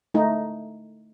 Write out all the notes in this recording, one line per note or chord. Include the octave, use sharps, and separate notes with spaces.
A3 D#4